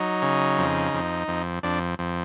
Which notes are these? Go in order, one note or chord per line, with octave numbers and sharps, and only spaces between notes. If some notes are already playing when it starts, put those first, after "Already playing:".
Already playing: F#3 D#4
C#3
F2
F2
F2
F2 D4
F2